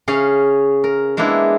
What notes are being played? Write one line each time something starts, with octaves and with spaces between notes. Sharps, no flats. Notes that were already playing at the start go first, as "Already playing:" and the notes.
C#3 C#4 G#4 F5
A#4
G#3 A#3 B3 D4 E4